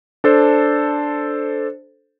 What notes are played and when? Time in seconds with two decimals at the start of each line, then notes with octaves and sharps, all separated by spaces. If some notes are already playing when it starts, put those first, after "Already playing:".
0.24 D4 A4 C5